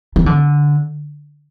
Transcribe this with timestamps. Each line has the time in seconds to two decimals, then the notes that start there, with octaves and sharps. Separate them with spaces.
0.16 E3
0.26 D3